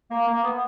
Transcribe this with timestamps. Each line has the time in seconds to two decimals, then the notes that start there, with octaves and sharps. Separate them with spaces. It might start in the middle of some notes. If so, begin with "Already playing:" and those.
0.11 A#3
0.27 A#3
0.44 B3